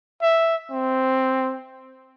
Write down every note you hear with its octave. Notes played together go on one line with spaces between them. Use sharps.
E5
C4